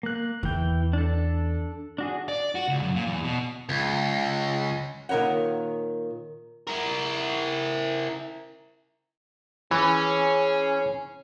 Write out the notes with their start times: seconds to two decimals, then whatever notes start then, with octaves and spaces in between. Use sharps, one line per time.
0.03 A#3 F#6
0.43 E2 E3 G5
0.93 D4 A4
1.98 D4 F#4 G#4
2.28 D5
2.55 F#4
2.68 C#2
2.83 F#2
2.95 A#2
3.07 E2
3.24 B2
3.69 C#2
5.09 A#2 D#3 A#4 C#5 F#5
6.68 E4 A#4
9.71 E3 C#4 G#4